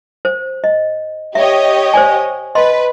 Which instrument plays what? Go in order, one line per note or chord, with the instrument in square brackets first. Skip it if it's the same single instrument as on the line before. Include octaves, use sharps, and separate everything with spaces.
[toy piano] C5
D#5
[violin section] G4 C#5 D#5 [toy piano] E5
[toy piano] C5 D5 G#5
[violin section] B4 [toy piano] D#5 C6